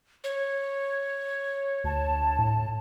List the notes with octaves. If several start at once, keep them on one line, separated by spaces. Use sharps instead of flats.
C#5
D2 A5
A2